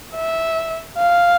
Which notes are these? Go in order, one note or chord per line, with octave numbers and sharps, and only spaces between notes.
E5
F5